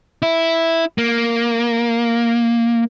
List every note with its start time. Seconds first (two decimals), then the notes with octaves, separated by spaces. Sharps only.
0.22 E4
0.98 A#3